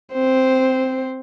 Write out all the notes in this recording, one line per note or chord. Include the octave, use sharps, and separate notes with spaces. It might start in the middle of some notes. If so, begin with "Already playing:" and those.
C4 C5